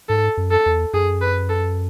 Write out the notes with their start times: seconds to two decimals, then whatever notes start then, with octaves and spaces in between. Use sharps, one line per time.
0.09 G#2 A4
0.37 F#2
0.51 A4
0.66 E2
0.93 F#2 G#4
1.21 B4
1.49 A4